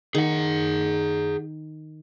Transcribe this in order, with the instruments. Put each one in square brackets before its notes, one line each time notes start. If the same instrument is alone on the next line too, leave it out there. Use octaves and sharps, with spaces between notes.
[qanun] D#3 [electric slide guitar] G#4 F#5